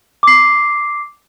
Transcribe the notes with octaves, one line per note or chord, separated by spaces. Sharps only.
D6 C7